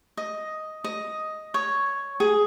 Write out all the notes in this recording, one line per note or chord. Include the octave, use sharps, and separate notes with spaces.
D#5
D#5
C#5
G#4